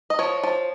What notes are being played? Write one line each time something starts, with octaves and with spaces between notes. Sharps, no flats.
D#5
F3 C#5
F3